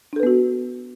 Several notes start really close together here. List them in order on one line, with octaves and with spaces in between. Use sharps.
D4 A4 B4 B3 F#4